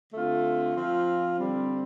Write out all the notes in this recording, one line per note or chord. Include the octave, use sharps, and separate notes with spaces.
D3 A3 C4 F4
F3 C4 F4
D3 G3 C4